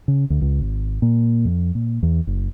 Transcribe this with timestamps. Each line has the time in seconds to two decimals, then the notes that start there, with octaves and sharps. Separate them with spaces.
0.08 C#3
0.30 D2
0.42 C#2
0.61 G#1
1.02 A#2
1.45 F2
1.75 A#2
2.03 E2
2.27 F#1